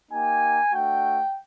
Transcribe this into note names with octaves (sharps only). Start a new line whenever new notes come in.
A#3 D#4 G4 G#5
A3 D4 F#4 G5